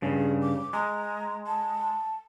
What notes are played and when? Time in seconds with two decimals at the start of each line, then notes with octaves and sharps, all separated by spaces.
0.02 G2 C#3 G#4
0.42 D6
0.73 G#3 A#5
1.46 A5